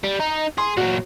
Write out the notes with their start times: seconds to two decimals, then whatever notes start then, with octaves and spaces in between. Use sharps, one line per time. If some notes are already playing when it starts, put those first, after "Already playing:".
0.04 G3
0.20 D#4
0.58 G#4 C6
0.77 A#2 F#3 F#4